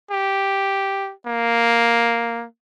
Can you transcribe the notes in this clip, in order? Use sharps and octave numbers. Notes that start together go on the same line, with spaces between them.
G4
A#3